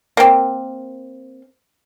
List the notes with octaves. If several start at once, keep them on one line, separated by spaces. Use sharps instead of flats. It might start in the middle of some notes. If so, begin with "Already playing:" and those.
A#3 C4